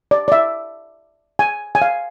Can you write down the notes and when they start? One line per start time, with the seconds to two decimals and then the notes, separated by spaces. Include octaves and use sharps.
0.11 D5
0.28 D5
0.32 E5
1.39 G#5
1.75 G#5
1.82 F5